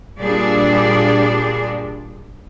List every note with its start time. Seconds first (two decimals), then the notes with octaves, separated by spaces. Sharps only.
0.19 A#2 G3 D4 G#4 D5